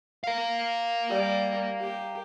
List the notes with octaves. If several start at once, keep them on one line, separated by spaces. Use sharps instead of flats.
A#4 F5
G3
G4